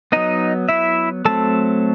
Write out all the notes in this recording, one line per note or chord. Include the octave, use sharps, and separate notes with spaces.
F#3 B3 D#4 D#5
E4 E5
F#3 A3 C4 A4 A5